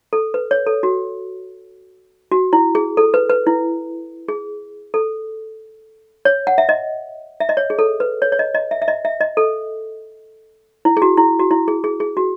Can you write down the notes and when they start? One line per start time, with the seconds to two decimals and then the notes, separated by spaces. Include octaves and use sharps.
0.13 A4
0.34 B4
0.51 C#5
0.67 A4
0.83 F#4
2.31 F#4
2.53 E4
2.75 G#4
2.97 A4
3.14 B4
3.30 B4
3.47 E4
4.29 G#4
4.94 A4
6.25 C#5
6.47 F#5
6.58 E5
6.69 D#5
7.40 E5
7.49 D#5
7.57 C#5
7.70 G#4
7.79 A4
8.00 B4
8.22 C#5
8.32 C#5
8.39 D#5
8.55 D#5
8.71 E5
8.82 E5
8.88 D#5
9.05 E5
9.21 D#5
9.37 A4
10.85 E4
10.97 G#4
11.02 F#4
11.17 E4
11.39 F#4
11.51 E4
11.68 G#4
11.84 G#4
12.00 G#4
12.17 F#4